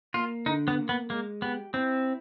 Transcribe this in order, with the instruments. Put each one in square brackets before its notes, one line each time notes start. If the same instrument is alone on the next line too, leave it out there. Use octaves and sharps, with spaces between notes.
[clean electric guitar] A#3 [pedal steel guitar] F4
[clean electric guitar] D3 [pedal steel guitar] D#4
[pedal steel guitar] B3
[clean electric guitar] A#3
[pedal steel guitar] B3
[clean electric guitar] G#3 [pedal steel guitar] A#3
[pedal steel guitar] B3 [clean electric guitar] G4
[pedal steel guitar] C4 [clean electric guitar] E4